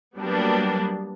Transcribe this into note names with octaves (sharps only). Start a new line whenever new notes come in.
F#3 G3 A#3 B3 D4